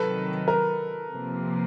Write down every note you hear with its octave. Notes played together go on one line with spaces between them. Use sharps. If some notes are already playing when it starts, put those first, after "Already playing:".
Already playing: C3 D#3 F#3 A4 B4
A#4
C3 F3 A#3